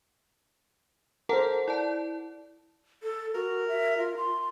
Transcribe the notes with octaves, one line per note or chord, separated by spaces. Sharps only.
A4 A#4 C5 F#5 A5
E4 D5 A5
A4
F#4 A#4
E5
F4
C6